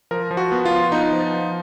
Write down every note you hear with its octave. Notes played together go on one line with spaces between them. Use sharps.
F3 A#4
F3
F#4
B3
F4
F3
B3 D#4
F3
F3